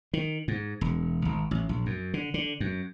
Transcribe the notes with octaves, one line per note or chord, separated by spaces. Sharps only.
D#3
G#2
E1
G#1
A1
A#1
F#2
D3
D3
F#2